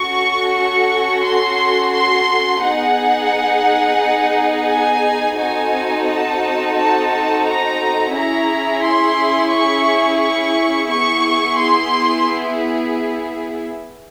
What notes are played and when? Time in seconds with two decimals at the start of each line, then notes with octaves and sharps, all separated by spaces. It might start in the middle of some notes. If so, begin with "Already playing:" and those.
Already playing: C#4 F#4 A4 C#6
0.55 C#6
1.24 C6
1.93 C6
2.61 B3 D#4 G#4 F#5
4.69 G#5
5.38 C4 D#4 F#4 A4 G#5
6.06 A5
6.75 A5
7.44 A#5
8.13 C#4 E4 G#4 A#5
8.83 C6
9.51 C#6
10.20 C#6
10.89 B3 E4 G#4 C#6
11.58 C6